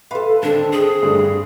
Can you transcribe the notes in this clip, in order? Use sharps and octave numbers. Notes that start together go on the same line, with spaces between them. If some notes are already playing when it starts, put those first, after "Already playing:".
A4 B4 F5 B5 C6
D#2 D3 C4 D4 A4
G#4
D2 G2 D3